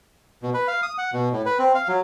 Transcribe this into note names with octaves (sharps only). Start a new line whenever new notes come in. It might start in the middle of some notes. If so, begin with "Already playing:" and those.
B2
B4
F5
D#6
F#5
B2
A2
B4
C4
F5
F#3